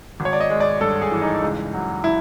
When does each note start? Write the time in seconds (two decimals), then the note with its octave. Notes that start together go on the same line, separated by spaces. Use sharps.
0.20 G#1
0.25 C#5
0.33 D5
0.40 D#5
0.50 G#3
0.60 D5
0.81 G2 A4
1.02 G#4
1.12 E3
1.22 D#4
1.42 C#2
1.73 F#3
2.04 E4